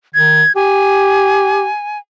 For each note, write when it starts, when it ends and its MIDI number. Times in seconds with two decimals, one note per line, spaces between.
0.14 0.43 51
0.14 0.52 92
0.56 1.67 67
0.56 1.98 80